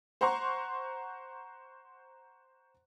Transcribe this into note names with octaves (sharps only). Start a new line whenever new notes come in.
C5 F#5 A#5 C6 C#6